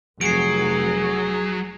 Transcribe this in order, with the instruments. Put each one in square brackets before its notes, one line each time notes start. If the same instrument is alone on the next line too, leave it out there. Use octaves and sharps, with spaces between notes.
[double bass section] F1 [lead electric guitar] F#3 [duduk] G#4 [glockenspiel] C7 D7